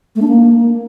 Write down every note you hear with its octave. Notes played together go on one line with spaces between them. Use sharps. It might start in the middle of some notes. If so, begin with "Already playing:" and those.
A3
D4
A#3